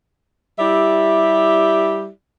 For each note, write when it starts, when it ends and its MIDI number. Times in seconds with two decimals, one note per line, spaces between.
0.59 2.09 55
0.59 2.09 64
0.59 2.09 67
0.59 2.09 74
0.59 2.09 76